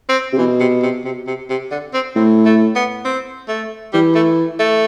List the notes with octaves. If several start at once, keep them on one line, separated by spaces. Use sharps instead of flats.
C4
C3
B2 E3
C3
C3
C3
C3
C3
D3
C4
A2 C4
A3
B3
C4
A3
E3 G3
A3
A3